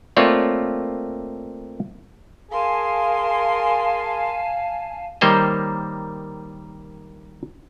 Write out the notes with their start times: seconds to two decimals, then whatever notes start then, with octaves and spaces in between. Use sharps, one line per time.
0.17 A3 A#3 C4 F4 C#5 D5
2.51 G#4 A#4 F5 G#5 A5 C6
5.21 D#3 G3 A#3 C5 C#5 D#5